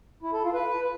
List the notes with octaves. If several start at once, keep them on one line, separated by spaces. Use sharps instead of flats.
E4
A4
F4
B4